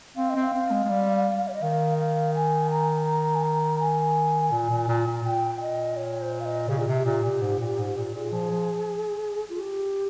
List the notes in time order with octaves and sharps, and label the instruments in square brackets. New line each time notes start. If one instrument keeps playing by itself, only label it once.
[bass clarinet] C4 [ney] F5
[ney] D#5
[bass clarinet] C4
[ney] F5
[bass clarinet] C4
G#3
G#3
G3
[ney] C#5
D#5
[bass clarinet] D#3 [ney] F5
[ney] F5
G#5
A#5
A#5
G#5
A#5
G#5
[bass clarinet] A#2
A#2
A#2
A#2
[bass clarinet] A#2 [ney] G5
[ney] D#5
C#5
C5
F5
D#5
[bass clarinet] C#3 [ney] G4
[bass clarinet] A#2 [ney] G#4
[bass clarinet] C3 [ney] G4
[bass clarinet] A#2
A#2
G#2
A#2
G#2
A#2
[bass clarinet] A#2 [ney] G#4
[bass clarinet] F3
F3
[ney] F4
G4